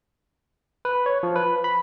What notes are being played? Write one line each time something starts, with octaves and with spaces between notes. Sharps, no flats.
B4
C#5
F3
B4
B5